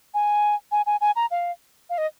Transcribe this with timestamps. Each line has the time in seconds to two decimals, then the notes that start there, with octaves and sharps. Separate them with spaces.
0.14 G#5
0.72 G#5
0.86 G#5
1.01 G#5
1.16 A#5
1.31 F5
1.90 F5
1.98 D#5